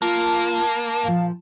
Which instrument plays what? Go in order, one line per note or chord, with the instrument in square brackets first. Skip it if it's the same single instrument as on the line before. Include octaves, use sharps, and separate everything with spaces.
[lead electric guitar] A#3 [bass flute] F4 [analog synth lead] A5
[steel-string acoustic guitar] A#2 F3 [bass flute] F5